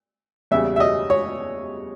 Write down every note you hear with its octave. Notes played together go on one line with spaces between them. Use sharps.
E2 C#3 G3 E5
E5
D#5
C#5